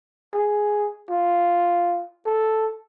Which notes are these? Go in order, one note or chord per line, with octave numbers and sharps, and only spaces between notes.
G#4
F4
A4